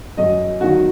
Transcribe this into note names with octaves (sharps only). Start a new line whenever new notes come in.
F#2 D#5
D#3 F#3 F#4